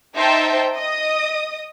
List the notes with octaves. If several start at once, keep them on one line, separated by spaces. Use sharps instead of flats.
D#4 C5 E5 G5 A5
D#5 D#6